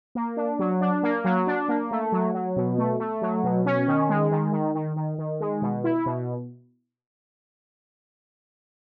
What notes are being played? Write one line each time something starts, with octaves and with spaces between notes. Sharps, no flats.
A#3
D4
F#3
D4
A#3
F#3
D4
A#3
A3
F#3
F#3
B2
A3
A3
F#3
B2
C#4
D#3
G#3
D#3
D#3
D#3
D#3
D#3
G#3
B2
E4
B2